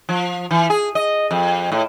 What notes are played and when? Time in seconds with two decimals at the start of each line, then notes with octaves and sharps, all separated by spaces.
0.09 F3
0.51 E3
0.70 G#4
0.95 D#5
1.31 F2
1.72 A2